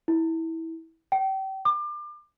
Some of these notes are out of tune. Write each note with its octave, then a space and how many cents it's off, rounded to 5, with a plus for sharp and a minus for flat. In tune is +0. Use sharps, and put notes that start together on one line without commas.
E4 -20
G5 -35
D6 +30